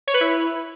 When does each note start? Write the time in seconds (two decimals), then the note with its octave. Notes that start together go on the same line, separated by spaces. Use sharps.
0.07 C#5
0.14 B4
0.21 E4